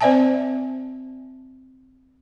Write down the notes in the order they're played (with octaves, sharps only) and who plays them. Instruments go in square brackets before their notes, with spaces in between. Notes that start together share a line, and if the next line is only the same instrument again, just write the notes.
[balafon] C4 C5 D5 E5 G#5 A5